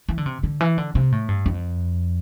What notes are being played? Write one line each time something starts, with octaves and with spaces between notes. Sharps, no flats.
E3
D3
C3
D3
E3
D3
C3
A2
G2
F2